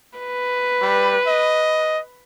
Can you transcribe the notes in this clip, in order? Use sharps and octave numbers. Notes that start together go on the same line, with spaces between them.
B4
G3
D#5